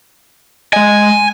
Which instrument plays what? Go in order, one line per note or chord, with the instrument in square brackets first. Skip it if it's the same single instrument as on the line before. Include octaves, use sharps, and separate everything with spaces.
[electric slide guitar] G#3 D#5 [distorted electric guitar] G#5